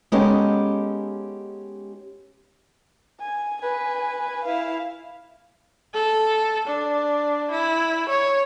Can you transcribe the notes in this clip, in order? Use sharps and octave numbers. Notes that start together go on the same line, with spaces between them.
G#3 B3 C#4 D#4 G4 A4
G#5
B4 G#5
E4 F5
A4
D4
E4
C#5